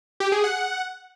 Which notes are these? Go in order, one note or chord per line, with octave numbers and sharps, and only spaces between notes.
G4
G#4
F#5